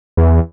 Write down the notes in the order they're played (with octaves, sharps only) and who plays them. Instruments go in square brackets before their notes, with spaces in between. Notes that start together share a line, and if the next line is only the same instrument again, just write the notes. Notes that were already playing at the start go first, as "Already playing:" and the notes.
[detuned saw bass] E2